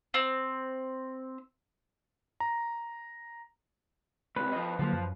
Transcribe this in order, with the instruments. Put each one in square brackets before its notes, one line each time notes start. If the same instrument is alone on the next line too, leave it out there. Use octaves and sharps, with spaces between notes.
[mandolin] C4
[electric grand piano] A#5
[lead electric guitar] C#2 C3 [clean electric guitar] B4
[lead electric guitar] F3 D#5
[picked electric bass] D3 F#3 A#3 [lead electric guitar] F3
[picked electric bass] F#2